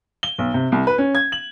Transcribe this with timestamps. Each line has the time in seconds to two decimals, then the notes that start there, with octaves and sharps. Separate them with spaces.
0.23 G7
0.38 B1
0.54 C3
0.72 C2
0.87 B4
0.98 C#4
1.15 G#6
1.32 F#7